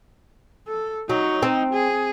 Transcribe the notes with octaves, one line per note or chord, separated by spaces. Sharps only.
A4
F#3 D#4
C4
G#4